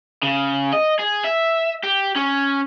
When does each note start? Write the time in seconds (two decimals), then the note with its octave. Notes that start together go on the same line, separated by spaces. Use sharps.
0.23 C#3
0.73 D#5
0.99 G#4
1.24 E5
1.83 G4
2.16 C#4